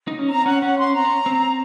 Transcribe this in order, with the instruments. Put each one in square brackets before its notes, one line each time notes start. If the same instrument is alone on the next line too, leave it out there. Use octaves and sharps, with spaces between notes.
[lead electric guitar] D#4
C#4
[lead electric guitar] C4 [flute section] A#5
[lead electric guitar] C#4 [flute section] F#5
[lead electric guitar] C#4 [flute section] F#5
[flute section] C6
[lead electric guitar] C4 [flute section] A#5
[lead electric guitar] C#4
C4